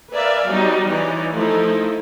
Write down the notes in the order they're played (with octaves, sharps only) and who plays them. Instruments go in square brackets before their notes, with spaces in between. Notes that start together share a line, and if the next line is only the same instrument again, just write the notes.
[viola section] A#4 B4 D5 E5 F5 G#5
F#3 G3 B3 D#4
E3 D#4 C#5 D5
F3 A3 D#4 E4